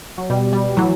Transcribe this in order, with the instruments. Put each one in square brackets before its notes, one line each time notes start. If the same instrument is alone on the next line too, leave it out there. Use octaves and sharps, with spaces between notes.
[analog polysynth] F#3
B2 G3
G3
A2 E3 F#3